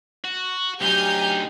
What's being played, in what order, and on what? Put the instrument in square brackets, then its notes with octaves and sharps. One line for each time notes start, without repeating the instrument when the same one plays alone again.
[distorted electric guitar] F#4
[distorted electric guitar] D2 D#4 [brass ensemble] F#3 G4 [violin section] G#5 F6 G6